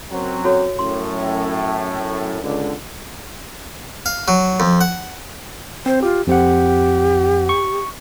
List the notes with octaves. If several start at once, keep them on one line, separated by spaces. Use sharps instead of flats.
F#2 F#3 C4
F#4 A4 C#5
F#2 A2 C6
C#2 D3
F5
F#3
F2
F#5
C4 C5
F4 G4
F2 C4 G4 F#5
C#6